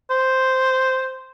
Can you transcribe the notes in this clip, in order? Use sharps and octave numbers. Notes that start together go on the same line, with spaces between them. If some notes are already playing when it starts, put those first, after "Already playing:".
C5